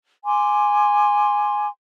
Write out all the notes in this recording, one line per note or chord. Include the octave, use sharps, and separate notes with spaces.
G#5 C6 D6